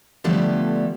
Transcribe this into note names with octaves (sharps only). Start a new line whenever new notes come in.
D3 F3 G3 A3 B3 D4